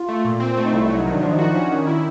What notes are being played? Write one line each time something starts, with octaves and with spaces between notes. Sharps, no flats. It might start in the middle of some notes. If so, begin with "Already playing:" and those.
Already playing: F4
A3
A#2
C4
A3
D#4
C2 E4
E4
F#3
D#4
D#3 D4
F3 D4
D#4
D4 F#4
C#4
D#3
E4